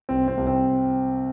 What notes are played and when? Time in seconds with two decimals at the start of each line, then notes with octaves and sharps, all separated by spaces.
0.09 C2 C4
0.28 C4
0.37 C2
0.47 C4